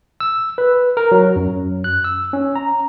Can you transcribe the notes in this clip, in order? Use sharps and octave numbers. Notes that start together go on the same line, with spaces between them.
E6
B4
A#4
F#3
F#2
F#6
E6
C#4
A#5